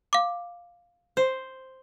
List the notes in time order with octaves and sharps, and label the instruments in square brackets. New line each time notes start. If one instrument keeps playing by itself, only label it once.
[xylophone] F5 D6
[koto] C5